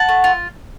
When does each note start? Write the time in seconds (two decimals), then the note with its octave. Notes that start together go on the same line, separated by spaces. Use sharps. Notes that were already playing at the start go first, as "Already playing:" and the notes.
Already playing: F#5 A5
0.09 A3
0.24 F4